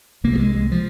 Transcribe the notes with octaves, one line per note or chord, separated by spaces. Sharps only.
C2 C3 A#3
F3
G#3
G#3
F3